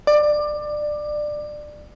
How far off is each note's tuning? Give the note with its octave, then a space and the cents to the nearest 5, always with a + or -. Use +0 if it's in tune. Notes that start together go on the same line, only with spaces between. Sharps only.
D5 +20